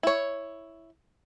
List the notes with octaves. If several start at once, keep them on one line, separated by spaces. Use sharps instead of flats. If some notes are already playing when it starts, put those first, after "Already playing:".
E4 C#5